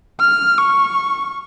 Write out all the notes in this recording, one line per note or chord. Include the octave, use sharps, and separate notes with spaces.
F6
C#6